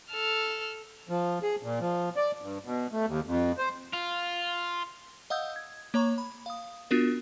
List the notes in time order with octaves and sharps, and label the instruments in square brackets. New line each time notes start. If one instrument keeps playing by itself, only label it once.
[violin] A4 F6
[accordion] F3
G#4
A#2
F3
D5
G2
B2
A3
D#2
F2
C5
[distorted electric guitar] F4
[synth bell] D#5 F5 F#5 D#6 E6 G6
G#6
A#3 C#5 A#5 C#6
B5
F5 D#6
B3 D4 F4 F#4 A#4